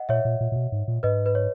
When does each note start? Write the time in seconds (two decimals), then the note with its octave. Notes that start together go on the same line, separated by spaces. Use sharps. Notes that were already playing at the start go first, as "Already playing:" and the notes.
Already playing: D#5 F#5
0.09 A#2 C#5 E5
0.25 A#2
0.40 A#2
0.52 A#2
0.56 B2
0.72 G#2
0.88 A#2
1.03 G#2 B4 D#5
1.26 B4
1.35 C#5